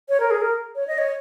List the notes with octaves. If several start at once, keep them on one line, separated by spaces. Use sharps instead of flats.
C#5
A#4
G#4
A#4
C#5
D#5
C#5